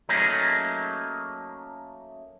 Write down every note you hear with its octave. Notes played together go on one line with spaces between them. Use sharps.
F#3 A3 A#3 C#4 D#4 G#4